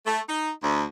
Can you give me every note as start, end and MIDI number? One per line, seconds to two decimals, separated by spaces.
0.06 0.20 57
0.27 0.49 63
0.62 0.84 38